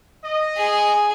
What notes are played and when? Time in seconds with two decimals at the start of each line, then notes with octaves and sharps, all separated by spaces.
0.23 D#5
0.56 G#4